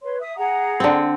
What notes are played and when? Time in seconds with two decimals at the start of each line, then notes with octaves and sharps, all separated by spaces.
0.02 B4 C#5 C6
0.19 E5 D#6
0.36 G#4 F#5 A#5
0.80 D3 C4